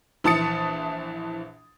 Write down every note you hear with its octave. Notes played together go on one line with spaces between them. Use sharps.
A#1 E3 A5 D#6 A6 C#7